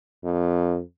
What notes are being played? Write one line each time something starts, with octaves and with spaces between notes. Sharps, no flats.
F2